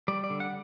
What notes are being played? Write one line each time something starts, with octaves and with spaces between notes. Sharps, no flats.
G3 D5
D5
D3
F#5